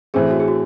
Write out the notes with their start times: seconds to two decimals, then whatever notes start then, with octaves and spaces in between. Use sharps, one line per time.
0.14 A2 E3 C4 G#4
0.31 F#4
0.40 G#4
0.48 F#4